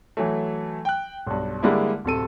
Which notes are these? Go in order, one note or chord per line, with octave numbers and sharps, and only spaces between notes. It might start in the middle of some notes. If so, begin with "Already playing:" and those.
E3 F#3 A3
G5 F#6
B1 G2
D3 G3 G#3 A#3 D4 E4
D1 C3 A4 D#7